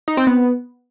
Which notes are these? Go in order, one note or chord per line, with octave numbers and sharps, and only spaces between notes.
D#4
C4
B3